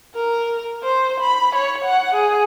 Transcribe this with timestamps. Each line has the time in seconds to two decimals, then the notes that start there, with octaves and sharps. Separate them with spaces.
0.15 A#4
0.83 C5
1.21 B5
1.55 C#5
1.85 F#5
2.15 G#4